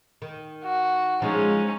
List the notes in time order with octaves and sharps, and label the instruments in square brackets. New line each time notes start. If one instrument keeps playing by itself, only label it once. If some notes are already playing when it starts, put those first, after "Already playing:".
[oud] D#3
[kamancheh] F#4
[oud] F3 G#3 G#4 [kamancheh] C#4 D#4